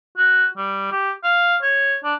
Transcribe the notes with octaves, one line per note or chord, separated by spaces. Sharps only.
F#4
G3
G4
F5
C#5
D4